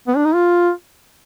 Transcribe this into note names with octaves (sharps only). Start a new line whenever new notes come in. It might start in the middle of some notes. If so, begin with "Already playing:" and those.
B3
D4
D#4
F4